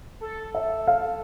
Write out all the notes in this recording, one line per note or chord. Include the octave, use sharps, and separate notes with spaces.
A4
E5
F5